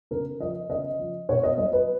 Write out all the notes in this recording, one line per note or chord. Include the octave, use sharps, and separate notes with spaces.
C#3 A#4
F3 D#5
C#3 D#5
F3
B2 C#5
D#5
F#3 D#5
B4